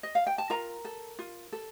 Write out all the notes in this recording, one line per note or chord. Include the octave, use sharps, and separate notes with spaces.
D#5
F5
G5
A5
F4 A#4 A#5
A4
F4
A4